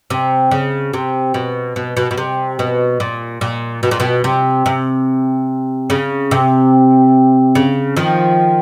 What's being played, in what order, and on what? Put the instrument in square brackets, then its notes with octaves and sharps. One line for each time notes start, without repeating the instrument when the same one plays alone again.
[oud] C3
C#3
C3
B2
B2
B2
B2
C3
B2
A#2
A#2
B2
A#2
B2
C3
C3
C#3
C3
C#3
D#3 F3